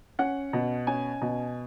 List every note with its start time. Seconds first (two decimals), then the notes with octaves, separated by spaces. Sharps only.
0.19 C#4 F#5
0.53 B2
0.87 C#4 G#5
1.21 B2